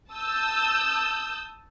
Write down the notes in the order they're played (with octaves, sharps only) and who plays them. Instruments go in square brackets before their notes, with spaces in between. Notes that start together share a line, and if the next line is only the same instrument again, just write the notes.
[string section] A5 D#6 E6 G6